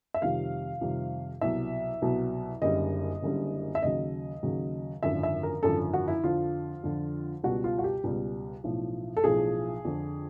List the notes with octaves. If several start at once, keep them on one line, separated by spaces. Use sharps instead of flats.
E5
F2 C3 D#3 G3 F5
F2 C3 D#3 G3
C2 B2 F#3 E5
C2 B2 F#3
F#1 F#2 D3 G3 D#5
F#1 F#2 D3 G3
E5
D#2 C#3 F#3 D#5
D#2 C#3 F#3
G#1 F#2 D3 F3 E5
E5
A#4
G#1 F#2 D3 F3 A4
F#4
E4
F2 D3 F3 F4
F2 D3 F3
C#2 B2 G3 F#4
F4
F#4
G4
C#2 B2 G3
B1 A2 F3
A4
B1 A2 F3 G#4
F2 D3 F3